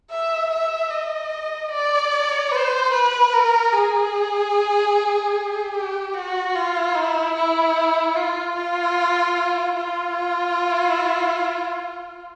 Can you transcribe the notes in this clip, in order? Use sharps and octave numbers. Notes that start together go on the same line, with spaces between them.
E5
E5
D#5
D5
C5
B4
A#4
G#4
G4
F#4
F4
E4
E4
F4
F4
F4